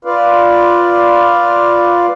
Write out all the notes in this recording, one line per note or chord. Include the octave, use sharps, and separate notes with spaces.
F4 B4 D5 F5